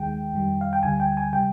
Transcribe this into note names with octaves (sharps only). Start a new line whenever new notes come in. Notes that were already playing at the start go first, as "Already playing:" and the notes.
Already playing: D#2 D#3 G#3 G5
F2 D#3 G3
F5
G5
D2 D3 G3 G#5
G5
G#5
C3 G3 G5